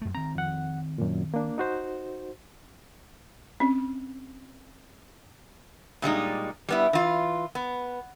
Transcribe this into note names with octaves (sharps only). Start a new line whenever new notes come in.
F#2 A3
D#3 C4 A#5
F2 F#5
F#2 A#2
A#3 D4
D#4 F#4 C5
C4 C#4
A#2 G3 G#3 D#4
G3 B3 E4
E3 F4
B3